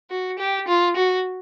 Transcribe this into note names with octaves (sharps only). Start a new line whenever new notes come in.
F#4
G4
F4
F#4